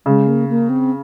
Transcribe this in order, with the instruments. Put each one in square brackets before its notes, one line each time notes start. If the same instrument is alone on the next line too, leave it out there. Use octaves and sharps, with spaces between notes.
[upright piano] C#3 [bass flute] G#3
[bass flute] A#3
A#3
C4